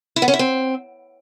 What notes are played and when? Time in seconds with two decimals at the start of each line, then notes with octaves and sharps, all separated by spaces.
0.16 E4
0.22 B3
0.28 C#4
0.34 E4
0.39 C4